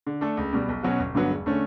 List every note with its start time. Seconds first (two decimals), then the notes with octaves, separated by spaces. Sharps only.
0.07 D3
0.21 A3 D4 A4
0.37 C#2
0.53 B2 G3
0.69 B1
0.83 B2 F#3 C#4 F#4
1.00 G1
1.15 G2 D3 F#3 B3
1.30 E1
1.46 D3 A3 C#4